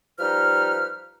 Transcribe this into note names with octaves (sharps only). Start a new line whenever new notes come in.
F3 G3 D#4 B4 F5 F6